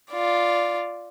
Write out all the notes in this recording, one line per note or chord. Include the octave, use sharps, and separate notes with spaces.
F4 D5